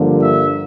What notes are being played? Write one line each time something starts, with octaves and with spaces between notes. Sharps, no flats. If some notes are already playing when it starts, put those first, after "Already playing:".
Already playing: G2 D3 F3 A#3
E5